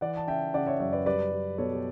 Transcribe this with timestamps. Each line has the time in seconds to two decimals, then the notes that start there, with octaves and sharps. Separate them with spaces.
0.01 E3 D5 F#5
0.17 A5
0.27 C#3 E5 G5
0.54 C#3 D5 F#5
0.66 C#5 E5
0.80 F#2 C#5 E5
0.93 B4 D5
1.06 G3 B4 D5
1.32 G3
1.58 B2 A4 C#5
1.73 G4